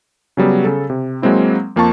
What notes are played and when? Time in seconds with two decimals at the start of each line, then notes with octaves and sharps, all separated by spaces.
0.37 C#3 F#3 G3 B3
0.64 C#3 A4
0.90 C3
1.22 F#3 G#3 A#3 C4 E4
1.76 F2 A#3 F4 A5 C#6